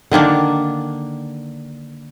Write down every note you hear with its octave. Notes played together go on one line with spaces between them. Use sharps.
D3 D#3 A#3 D4